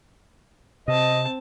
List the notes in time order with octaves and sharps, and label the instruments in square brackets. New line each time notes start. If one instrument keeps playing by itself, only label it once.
[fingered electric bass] C3 [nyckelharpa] C4 A5 [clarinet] D#5